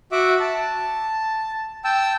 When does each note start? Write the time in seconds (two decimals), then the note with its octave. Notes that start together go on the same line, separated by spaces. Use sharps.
0.12 F#4 E5 F#5 D6
0.40 A5
1.84 G5 A5 E6